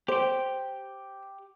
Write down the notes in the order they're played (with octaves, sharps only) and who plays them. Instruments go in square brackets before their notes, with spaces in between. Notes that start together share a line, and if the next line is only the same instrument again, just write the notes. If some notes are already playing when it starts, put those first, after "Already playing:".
[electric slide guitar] G4 G5 [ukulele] C5